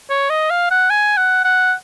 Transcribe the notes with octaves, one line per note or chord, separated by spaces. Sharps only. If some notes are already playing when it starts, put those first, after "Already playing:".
C#5
D#5
F5
F#5
G#5
F#5
F#5